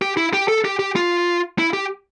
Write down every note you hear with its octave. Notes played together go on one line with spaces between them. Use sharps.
G4
E4
G4
A4
G4
G4
F4
E4
G4